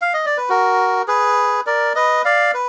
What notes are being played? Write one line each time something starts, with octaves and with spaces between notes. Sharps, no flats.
F5
D#5
D5
B4
F#4 A#4
G#4 B4
A#4 D5
B4 D#5
D5 F5
B4